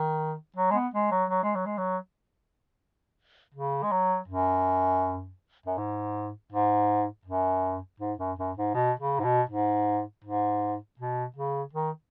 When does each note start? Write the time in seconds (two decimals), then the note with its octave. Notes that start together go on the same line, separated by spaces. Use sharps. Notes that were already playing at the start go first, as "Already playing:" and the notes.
Already playing: D#3
0.56 F#3
0.71 G#3
0.74 B3
0.94 G#3
1.11 F#3
1.30 F#3
1.43 G#3
1.55 F#3
1.66 G#3
1.78 F#3
3.54 C#3
3.83 G#3
3.91 F#3
4.28 F#2
5.66 F#2
5.78 G#2
6.52 G#2
7.26 F#2
8.00 G#2
8.19 F#2
8.38 F#2
8.57 G#2
8.75 B2
8.99 C#3
9.20 G#2
9.24 B2
9.49 G#2
10.24 G#2
10.99 B2
11.36 C#3
11.73 D#3